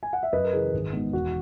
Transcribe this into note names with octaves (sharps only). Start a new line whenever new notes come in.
G#5
F#5
E5
F#2 B4 D#5
A#4
C#3 E3 G#4
G#1
G#2 D#3 G#3 B3
E1 F#4